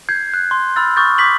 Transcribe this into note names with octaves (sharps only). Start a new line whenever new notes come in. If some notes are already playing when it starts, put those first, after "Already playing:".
G6 G#6 C7
F#6
C6
B5 C6 E6 F6 A6
C#6 D#6 F6 G6 A6
D6 G6 B6 F#7